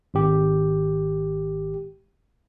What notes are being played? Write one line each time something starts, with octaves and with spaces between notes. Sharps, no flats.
G#1 G4